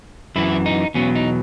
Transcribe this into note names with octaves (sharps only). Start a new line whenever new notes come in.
F#2 E3 E4
D#4
E2 B2 F#3 C#4
D#4